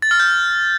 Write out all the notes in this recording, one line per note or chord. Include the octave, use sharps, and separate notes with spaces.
A6
F6
G6